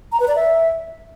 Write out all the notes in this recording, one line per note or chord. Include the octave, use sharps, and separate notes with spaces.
A#5
B4
D5
E5